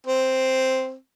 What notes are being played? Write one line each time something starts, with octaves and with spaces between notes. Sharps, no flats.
C4